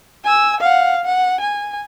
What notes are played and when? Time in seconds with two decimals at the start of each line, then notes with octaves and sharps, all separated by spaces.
0.24 G#5 E6
0.60 F5 F#5
1.05 F#5
1.41 G#5